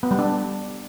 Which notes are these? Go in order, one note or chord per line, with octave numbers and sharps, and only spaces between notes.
B3
G3
D4